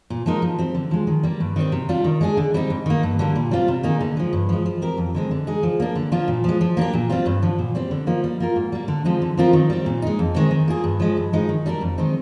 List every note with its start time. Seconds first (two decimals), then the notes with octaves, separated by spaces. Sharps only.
0.10 A#2
0.26 F3 G#3 D#4 A#4
0.42 F3
0.58 C4 G4
0.75 D3
0.91 F3 G#3
1.07 D#3
1.23 G3 A#3
1.40 G2
1.56 D#3 G3 C4 G4
1.72 C3
1.89 G3 D4 F4
2.04 D#3
2.21 G#3 D4 G#4
2.37 D3
2.54 G3 C4 D#4
2.70 G#2
2.86 D#3 A#3
3.03 G2
3.19 D3 G3 A#3
3.35 A#2
3.51 G3 C4 F4
3.68 C3
3.83 D#3 A#3 D#4 G#4
4.01 D3
4.17 F3 G#3
4.33 G2
4.49 F3 G#3
4.66 F3
4.82 C4 G4 A#4
4.97 F2
5.15 D3 G#3 C4
5.31 D3
5.47 G#3 D#4 G#4
5.63 F3
5.80 A#3 D4
5.95 D3
6.12 F3 A#3 D4 F4
6.28 A#2
6.44 F3 G#3
6.61 F3
6.77 A#3 D4 G4
6.93 A#2
7.09 G3 C4 F4
7.26 G2
7.42 D3 F3
7.59 A#2
7.75 G3 C4 G4
7.91 D3
8.07 F3 A#3 D#4
8.24 G3
8.40 A#3 F4 A#4
8.56 G#2
8.72 G3 A#3
8.88 D3
9.05 F3 G#3 C4 D#4
9.22 D3
9.37 F3 C4 F4 A#4
9.53 D#3
9.70 G3 C4
9.86 A#2
10.02 G#3 D#4
10.19 F2
10.35 D#3 G#3 C4
10.51 D#3
10.68 A#3 F4 G#4
10.84 G2
11.00 F3 G#3
11.17 G2
11.33 F3 G#3 D#4
11.49 D#3
11.66 G3 D4 G4 A#4
11.81 F2
11.98 D#3 G#3 C4 D#4